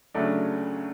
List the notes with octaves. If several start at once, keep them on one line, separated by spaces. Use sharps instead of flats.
D2 C#3 F#3 A3 D4